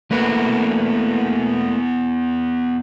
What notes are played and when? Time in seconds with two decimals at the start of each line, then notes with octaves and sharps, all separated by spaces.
0.11 E2 A3 A#3 F#4 B4